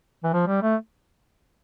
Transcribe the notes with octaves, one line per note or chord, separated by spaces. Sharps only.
E3
F3
G3
A3